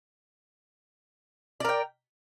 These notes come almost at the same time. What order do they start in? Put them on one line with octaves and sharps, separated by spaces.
D5 A#4 G5